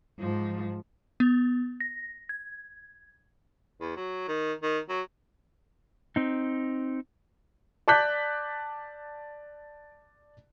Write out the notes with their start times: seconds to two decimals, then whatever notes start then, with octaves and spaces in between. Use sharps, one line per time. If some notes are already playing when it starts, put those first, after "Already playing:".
0.19 G#2 F3
1.20 B3
1.80 A#6
2.29 G#6
3.81 E2
3.96 F#3
4.28 D#3
4.63 D#3
4.89 F#3
6.16 C4 D#4
7.88 D5 A5 D6 F#6 G6 B6